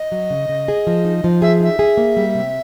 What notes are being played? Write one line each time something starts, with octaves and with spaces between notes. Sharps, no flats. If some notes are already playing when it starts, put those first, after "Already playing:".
Already playing: D#5
F#3
C#3
C#3
G#4
F3
D#4
F3
G#4 E5
D#4 E5
G#4
A#3
G3
C3